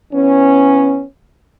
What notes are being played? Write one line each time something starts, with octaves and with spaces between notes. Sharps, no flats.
E3 B3 C#4